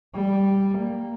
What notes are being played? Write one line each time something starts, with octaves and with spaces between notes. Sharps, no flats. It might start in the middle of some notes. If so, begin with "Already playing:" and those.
G3
A#3